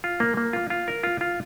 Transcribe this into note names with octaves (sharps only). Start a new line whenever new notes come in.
F4
A#3
A#3
F4
F4
A#4
F4
F4